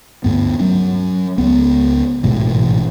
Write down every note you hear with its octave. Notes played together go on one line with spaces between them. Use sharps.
D2 G2 B3
F#3 C#4
C#2 B3
A1 G#2 B2 E3